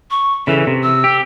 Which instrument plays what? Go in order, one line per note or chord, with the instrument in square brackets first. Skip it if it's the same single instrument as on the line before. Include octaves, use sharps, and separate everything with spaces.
[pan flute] C#6
[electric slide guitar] C#3 E3 [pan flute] A4
[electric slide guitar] C3
[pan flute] E6
[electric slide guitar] G4